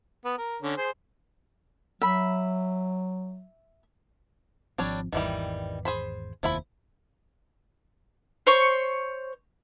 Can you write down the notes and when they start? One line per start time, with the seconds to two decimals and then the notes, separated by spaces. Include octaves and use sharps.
0.25 B3
0.38 A#4
0.62 D3 C#4
0.77 G#4 C5
2.01 F#3 E5 B5
4.78 G#1 F3 G3 C4 D4 C#5
5.12 G#1 E2 D#3 E3 G3
5.85 G#4 C5 B5
6.43 F1 D#2 F3 E4 B5
8.47 C5 C#5 C#6